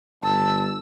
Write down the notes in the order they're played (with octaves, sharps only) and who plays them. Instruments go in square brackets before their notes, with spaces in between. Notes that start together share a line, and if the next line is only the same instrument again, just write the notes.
[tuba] G1 [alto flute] A5 [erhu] E6